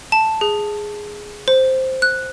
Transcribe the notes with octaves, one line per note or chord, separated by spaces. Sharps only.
A5
G#4
C5
F#6